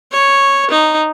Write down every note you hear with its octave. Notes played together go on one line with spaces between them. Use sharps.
C#5
D#4